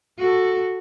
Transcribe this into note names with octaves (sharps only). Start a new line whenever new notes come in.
F#4 A4